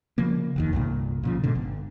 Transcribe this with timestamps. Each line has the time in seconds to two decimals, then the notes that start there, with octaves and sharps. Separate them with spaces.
0.18 C#3 F3 A#3
0.56 F1 D#2 D#3
0.73 C2 G2 A#2
1.23 A#2 C#3 F3
1.44 G#2 B2 D3
1.55 G1